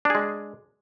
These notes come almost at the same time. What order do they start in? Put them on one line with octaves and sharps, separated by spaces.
D4 G#4 G#3